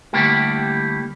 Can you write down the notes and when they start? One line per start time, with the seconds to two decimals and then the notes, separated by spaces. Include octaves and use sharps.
0.13 D3 G3 A3 A#3 E4 G4